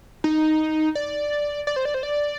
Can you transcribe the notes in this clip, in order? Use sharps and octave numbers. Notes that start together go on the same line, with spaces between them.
D#4
D5
D5
C5
D5
C5
D5